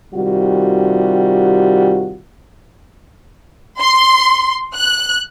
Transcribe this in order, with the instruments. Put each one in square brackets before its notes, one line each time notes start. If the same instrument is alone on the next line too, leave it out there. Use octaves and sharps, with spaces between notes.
[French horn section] C3 D#3 G3 F4 F#4
[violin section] C6
F#6